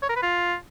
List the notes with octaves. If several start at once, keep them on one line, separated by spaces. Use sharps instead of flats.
C#5
A#4
B4
F4